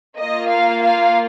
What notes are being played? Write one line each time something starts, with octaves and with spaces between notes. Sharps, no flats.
A#3 F4 D#5
F5
F5